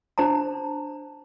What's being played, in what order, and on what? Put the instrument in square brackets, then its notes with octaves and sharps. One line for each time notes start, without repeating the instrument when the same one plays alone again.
[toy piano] D4 C5 A5 A#5